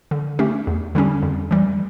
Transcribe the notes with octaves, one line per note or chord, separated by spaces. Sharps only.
D3
A3 C#4 G4
E2
D3 G3 C#4 G4
F2
E3 G3